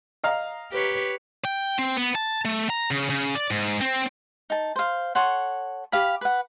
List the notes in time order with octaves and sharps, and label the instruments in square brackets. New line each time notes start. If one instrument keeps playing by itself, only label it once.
[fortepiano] D#5 F5 A#5
[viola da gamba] G4 B4 C#5
[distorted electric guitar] G5
C4
B3
A5
A3
A#5
C#3
C#3
D5
G#2
C4
[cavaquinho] D#4 A5
C5 F5
A4 C#5 F#5 C6
G4 F5 B5
B4 F#5